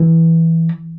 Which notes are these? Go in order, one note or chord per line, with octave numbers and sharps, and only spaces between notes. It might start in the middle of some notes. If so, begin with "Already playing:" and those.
Already playing: E3